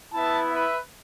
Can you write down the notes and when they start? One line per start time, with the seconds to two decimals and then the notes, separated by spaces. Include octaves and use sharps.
0.13 B3 E4 E5 A5
0.50 B4 E5